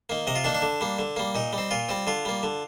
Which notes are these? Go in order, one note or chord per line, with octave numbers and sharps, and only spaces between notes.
D#3 A#3
C3 D#5
F4
D#3 A#3 D4
D4
D3
G3 A#3
D3
G3 A#3
A#2 D#4
G3
C4
A#2 F4
G3 C4
D3 F4
G3 A#3
D3